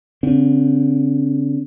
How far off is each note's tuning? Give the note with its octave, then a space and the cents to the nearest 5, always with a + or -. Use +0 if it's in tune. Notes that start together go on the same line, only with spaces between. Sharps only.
D3 -45 C4 -10